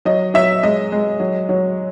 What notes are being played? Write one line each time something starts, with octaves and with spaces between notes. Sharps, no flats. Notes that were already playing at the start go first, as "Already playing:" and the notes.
F#3 D#5
F#3 E5
G#3 D#5
G#3
F#3
F#3